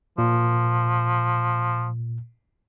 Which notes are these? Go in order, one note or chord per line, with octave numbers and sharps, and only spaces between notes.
A#2 F3